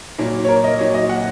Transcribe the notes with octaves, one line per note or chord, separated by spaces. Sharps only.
A#2 F#3 A#3
C#5
A#4
D#5
A#2 F#3 A#3 C#5
D#5
F#5